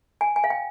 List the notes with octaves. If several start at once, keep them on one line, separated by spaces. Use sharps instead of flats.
G#5
G#5
F5
G5